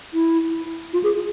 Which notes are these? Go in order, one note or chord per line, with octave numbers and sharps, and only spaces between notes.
E4
F4
G#4